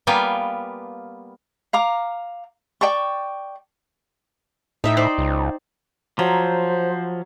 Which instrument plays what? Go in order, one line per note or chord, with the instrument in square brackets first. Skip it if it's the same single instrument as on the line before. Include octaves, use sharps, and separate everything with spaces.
[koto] G3 A#3 B3 F4 G5 G#5
[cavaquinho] F5 A#5 D6
D5 G5 A5 C#6
[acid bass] A2 [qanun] D#4 E5 G5
[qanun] D#4 C5 D5
[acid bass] C#2
[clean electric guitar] F3 [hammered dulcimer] F#3 [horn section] C5